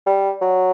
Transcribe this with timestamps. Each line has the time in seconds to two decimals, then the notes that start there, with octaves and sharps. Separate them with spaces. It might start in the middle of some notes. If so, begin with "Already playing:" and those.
0.06 G3
0.41 F#3